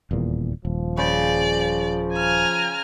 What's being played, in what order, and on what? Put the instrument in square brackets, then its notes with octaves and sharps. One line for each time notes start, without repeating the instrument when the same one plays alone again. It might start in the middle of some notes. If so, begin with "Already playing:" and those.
[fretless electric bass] D#1 E2 A#2
[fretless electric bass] D#1 [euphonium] F3
[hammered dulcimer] C#3 C5 [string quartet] D5
[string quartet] G#5 A#5 F6